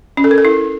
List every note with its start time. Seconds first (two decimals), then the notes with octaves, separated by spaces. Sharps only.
0.17 C#4
0.24 A4
0.31 A#4
0.38 A4
0.45 E4